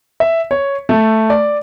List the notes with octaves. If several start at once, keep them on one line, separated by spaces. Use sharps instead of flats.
E5
C#5
A3
D5